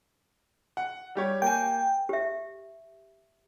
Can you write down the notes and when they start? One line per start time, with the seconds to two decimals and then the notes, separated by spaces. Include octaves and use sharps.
0.77 F#5
1.15 G3 G4 C#5
1.42 A#3 G5 G#5
2.09 G4 E5